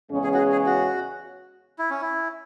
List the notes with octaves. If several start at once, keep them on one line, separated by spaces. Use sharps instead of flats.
E2 C#3 G#3 C#4
G#4
F#4
G#4
G#4
F#4
E4
C#4
E4